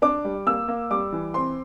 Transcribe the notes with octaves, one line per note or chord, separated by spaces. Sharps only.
D4 D6
G3
A#3 E6
A#3
G3 D6
E3
C4 C6